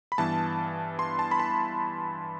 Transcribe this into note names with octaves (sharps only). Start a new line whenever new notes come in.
B5
G2 E3 B3 A5
C6
A5
B5
A5